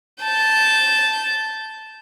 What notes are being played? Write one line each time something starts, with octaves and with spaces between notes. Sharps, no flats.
A5 G6